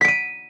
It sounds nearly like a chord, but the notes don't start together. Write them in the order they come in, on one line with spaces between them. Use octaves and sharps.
B6 D7 D#7